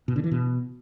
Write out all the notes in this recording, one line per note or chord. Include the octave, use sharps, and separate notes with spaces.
B2
D3
E3
B2